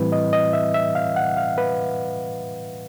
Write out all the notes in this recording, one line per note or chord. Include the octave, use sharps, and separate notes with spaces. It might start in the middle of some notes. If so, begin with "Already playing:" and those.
Already playing: A2 E3 G3 C4 E4 B4
D#5
D#5
E5
E5
F5
F#5
F5
B4